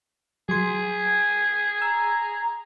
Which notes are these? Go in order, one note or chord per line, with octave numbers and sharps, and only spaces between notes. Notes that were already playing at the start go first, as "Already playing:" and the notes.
F#3 G#4 C6
A#5 E6